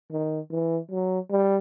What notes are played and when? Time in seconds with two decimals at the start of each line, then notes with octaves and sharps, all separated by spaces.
0.12 D#3
0.51 E3
0.91 F#3
1.31 G3